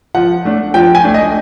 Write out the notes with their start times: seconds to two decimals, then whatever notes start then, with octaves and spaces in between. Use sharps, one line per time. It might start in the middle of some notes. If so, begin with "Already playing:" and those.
0.15 F3 F#5
0.45 A3 D4
0.74 F3 G5
0.95 G#5
1.04 A3 D4
1.14 D#5